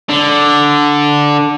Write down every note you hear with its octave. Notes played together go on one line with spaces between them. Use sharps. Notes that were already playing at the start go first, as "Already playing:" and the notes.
D3